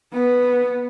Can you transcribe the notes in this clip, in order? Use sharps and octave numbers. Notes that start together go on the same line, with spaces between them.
B3